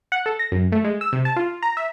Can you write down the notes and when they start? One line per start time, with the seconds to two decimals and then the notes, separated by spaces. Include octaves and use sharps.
0.12 F#5
0.26 A4
0.39 A#6
0.52 F#2
0.72 A3
0.84 G#3
1.01 E6
1.13 C3
1.25 A5
1.36 F4
1.62 A#5
1.77 E5